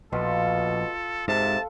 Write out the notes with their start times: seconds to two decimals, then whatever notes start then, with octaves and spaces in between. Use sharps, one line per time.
0.13 A#1 B2 F4 A4
1.28 G#2 C3 A4 F5 A5